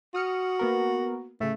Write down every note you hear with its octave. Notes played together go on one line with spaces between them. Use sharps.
F#4 D#6 F6 C#7
A#3 B3 A#4
A2 C#3 A3